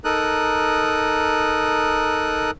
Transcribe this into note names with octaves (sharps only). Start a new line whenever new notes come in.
D#4 A4 A#4 D#6 F#6